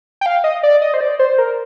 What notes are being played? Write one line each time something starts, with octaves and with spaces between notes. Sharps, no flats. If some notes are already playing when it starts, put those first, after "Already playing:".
G5
F5
D#5
D5
D#5
C5
D5
C5
A#4